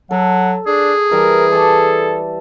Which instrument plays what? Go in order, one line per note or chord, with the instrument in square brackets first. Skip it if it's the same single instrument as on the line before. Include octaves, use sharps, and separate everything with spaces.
[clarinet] F#3 [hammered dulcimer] A4 [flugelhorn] F#5
[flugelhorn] D4 [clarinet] G#4
[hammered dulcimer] E3 G3 [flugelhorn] A#4
[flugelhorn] A4 [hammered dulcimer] A5 D6